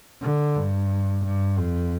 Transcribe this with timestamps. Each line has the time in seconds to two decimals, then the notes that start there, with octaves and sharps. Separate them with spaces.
0.22 D3
0.56 G2
1.25 G2
1.59 F2